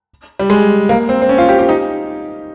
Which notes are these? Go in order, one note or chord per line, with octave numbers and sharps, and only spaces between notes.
G3
G#3
A#3
C4
C4
C#4
F4
G4
G4
D#4